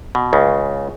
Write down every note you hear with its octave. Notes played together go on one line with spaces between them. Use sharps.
B2
C#2 C#3